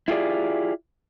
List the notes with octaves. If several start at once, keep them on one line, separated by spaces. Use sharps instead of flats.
E4 F4 G4 G#4 D5